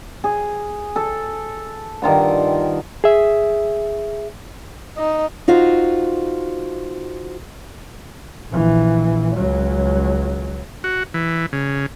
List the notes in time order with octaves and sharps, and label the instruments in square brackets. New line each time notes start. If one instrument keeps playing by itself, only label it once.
[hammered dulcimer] G#4
A4
G2 D#3 F4 F#5
[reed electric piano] G#4 E5
[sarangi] D#4
[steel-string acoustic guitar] D#4 F4 F#4 C5
[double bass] A#1 E3
C#2 F#3
[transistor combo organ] F#4
E3
C#3